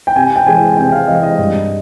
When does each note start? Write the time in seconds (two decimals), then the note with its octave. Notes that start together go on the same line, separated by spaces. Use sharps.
0.07 G5
0.16 C3 G#5
0.36 G5
0.46 E3 G#3 G#5
0.77 C3 G5
0.92 F5
1.07 E3 G#3 D#5
1.23 D#5
1.38 G2